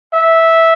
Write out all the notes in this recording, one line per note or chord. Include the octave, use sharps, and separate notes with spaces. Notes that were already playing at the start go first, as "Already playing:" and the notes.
E5